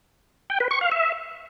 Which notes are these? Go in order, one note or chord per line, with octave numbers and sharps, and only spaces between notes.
G5
B4
C#6
F5
E5